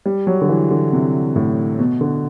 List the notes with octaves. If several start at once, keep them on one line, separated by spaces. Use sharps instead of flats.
G3
F#3
D3
E3
D3
C3
A2
B2
D3